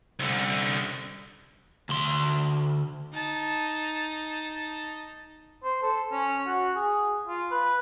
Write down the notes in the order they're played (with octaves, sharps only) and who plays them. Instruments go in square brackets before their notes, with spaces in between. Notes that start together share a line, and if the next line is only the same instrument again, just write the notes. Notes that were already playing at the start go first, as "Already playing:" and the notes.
[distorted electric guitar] C2 D3
[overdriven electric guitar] D2 C6
[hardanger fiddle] D#4 A5
[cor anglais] C5
A4
C#4
F#4
G#4
F4
B4